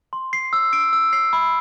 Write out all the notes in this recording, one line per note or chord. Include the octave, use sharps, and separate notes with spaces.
C6
C7
E6
D7
E6
C7
B5